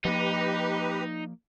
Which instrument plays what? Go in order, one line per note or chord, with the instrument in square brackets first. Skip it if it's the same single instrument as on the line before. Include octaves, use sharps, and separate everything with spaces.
[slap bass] F3 A#3 [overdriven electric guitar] D#4 [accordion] G4 B4